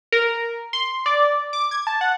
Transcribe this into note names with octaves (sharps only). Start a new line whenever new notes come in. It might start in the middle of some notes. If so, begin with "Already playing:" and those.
A#4
C6
D5
D6
G#6
A5
F#5